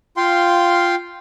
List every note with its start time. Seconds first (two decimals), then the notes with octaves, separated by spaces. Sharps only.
0.17 F4 F5 G5 C6